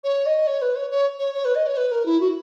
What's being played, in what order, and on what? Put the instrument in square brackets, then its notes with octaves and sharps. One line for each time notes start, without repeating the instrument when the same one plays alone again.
[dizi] C#5
D#5
C#5
B4
C#5
C#5
C#5
C#5
B4
D#5
C#5
B4
A#4
E4
F#4